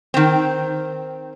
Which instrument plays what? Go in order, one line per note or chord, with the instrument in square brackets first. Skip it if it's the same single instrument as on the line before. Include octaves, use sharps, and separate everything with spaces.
[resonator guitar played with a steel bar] D#3 C4